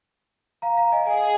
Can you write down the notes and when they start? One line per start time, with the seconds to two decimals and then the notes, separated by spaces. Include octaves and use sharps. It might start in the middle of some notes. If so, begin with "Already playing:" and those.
0.62 F5 A#5
0.77 F5 A#5
0.92 D#5 G#5
1.07 G#4 D#5 G#5